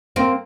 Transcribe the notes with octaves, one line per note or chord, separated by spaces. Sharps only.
A#3 C4